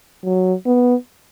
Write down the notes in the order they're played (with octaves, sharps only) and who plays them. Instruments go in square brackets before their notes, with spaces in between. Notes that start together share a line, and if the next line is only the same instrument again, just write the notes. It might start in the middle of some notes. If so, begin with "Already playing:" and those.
[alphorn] F#3
B3